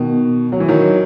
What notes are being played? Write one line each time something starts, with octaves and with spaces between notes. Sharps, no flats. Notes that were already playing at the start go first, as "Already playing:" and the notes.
Already playing: B2 D#3
F#3
E3
D#3 F#3